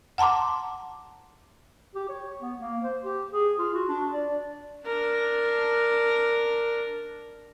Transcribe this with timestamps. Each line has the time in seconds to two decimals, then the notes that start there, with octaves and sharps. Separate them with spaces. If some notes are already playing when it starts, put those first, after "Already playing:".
0.18 F#5 A5 A#5 C6 D6
1.95 G4
2.09 C#5
2.42 B3
2.60 A#3
2.83 C5
3.03 G4
3.33 G#4
3.59 F4
3.74 F#4
3.89 D4
4.14 D5
4.86 D4 A#4